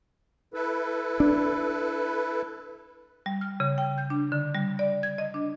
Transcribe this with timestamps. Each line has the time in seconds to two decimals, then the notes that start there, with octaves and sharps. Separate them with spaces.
0.54 E4 A4 B4
1.20 D4
3.26 G3
3.41 F6
3.60 C#3
3.78 G5
3.98 G6
4.10 D4
4.32 D3
4.55 G3
4.79 D5
5.03 G#6
5.18 D#5
5.34 D4